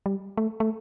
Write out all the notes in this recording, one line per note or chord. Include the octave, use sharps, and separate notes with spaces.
G3
A3
A3